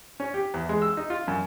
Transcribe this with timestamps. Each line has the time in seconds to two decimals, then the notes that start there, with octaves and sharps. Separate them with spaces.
0.20 C#4
0.34 G4
0.54 E2
0.69 G#3
0.82 E6
0.97 D#4
1.10 F4
1.28 F#2